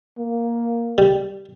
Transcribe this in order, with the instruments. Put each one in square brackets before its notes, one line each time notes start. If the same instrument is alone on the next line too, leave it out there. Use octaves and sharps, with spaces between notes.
[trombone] A#3
[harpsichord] G3